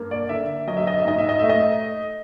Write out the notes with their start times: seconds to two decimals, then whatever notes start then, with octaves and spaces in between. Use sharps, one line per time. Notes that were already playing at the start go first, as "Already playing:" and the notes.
Already playing: G2 A#3
0.11 D5
0.29 D3 E5
0.67 F#3 D#5
0.77 E5
0.87 D#5
0.97 E5
1.05 G#2 D#5
1.18 E5
1.29 D#5
1.39 A3 E5
1.49 D#5